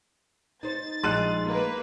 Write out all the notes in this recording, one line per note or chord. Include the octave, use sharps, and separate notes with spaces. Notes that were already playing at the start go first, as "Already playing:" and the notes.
D#4 C5 A6
A#1 G#3 D#4 C6 F#6 D#7
A#3 B4